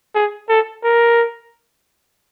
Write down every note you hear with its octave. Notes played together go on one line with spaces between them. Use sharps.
G#4
A4
A#4